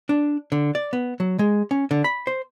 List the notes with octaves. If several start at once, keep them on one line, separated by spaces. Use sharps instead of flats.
D4
D3
D5
B3
F#3
G#3
C#4
D3
B5
C5